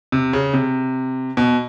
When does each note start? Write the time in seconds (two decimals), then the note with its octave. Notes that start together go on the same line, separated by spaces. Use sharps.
0.12 C3
0.33 C#3
0.54 C3
1.37 B2